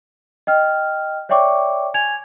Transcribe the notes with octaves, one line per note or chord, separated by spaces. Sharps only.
D#5 G5 F6
C#5 D5 E5 G5 C#6 D6
G#5 G#6 F7